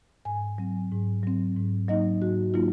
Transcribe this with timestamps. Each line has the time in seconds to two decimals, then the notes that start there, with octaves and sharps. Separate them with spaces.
0.25 G#2 G#5
0.58 F#3 C4
0.91 G#2
1.23 F#3 C4
1.57 G#2
1.88 F#3 A#3 D#4 D#5
2.22 G#2 F#4
2.54 F#3 A#3 D#4 F4